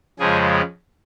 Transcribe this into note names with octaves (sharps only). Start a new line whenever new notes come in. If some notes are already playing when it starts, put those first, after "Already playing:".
F2 C#3 F3 G#3 G#4